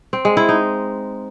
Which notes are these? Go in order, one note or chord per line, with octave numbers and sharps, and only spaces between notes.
C4
G#3
E4
D#4